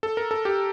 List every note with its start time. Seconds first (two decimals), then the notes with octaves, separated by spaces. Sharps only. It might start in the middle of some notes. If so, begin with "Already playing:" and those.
0.03 A4
0.17 A#4
0.31 A4
0.45 G4